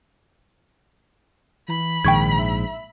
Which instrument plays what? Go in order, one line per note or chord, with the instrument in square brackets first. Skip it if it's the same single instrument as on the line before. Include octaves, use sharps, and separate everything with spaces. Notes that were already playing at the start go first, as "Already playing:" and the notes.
[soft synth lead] E3 [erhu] B5
[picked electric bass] A#1 G#2 [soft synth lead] D#3 [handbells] G5 C#6 G#6
[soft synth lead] E5